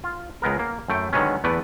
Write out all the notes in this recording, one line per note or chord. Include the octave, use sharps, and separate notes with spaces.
F4
C#2 G#3 B3 A#4
A#3
F#2 A3 G5
D3 D#3 F#3 G#3 B3 C#4
E2 A3 B3 B4 D5